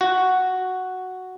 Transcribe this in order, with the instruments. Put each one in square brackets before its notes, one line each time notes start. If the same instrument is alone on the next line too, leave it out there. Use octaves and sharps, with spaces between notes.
[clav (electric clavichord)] F#4